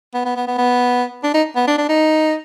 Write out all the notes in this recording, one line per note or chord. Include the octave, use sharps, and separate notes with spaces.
B3
B3
B3
B3
B3
D4
D#4
B3
D4
D4
D#4